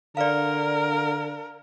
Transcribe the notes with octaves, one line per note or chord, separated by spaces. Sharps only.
D3 A#4 D5 F5